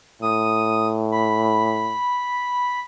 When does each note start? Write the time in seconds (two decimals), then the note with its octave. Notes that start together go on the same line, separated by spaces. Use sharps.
0.22 A2 D#6
1.12 B5